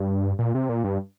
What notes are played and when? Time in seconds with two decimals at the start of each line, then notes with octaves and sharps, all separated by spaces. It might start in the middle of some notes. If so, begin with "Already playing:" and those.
Already playing: G2
0.39 A#2
0.55 C3
0.69 A#2
0.84 G2